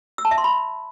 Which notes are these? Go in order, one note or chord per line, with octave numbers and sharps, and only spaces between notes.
E6
A5
E5
C6
B5